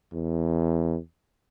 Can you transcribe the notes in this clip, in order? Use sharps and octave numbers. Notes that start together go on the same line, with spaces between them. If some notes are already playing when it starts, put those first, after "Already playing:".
E2